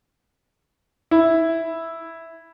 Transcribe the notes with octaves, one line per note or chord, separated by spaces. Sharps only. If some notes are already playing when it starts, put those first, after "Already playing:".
E4